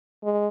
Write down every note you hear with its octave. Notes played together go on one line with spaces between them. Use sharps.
G#3